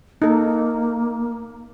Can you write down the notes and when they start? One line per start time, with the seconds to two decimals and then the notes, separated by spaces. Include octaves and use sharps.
0.22 A#3 D#4 A4